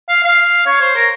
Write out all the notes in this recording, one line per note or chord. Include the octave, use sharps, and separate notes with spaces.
F5
F5
C#5
C5
A#4